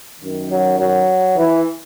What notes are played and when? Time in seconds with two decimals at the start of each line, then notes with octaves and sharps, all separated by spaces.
0.20 F#2 D#3
0.49 F#3
0.78 F#3
1.37 E3